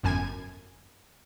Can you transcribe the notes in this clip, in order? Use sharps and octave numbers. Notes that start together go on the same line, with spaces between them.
G1 F#2 G#5 G#6